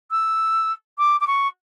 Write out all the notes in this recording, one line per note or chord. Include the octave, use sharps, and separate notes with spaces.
E6
D6
D6
C#6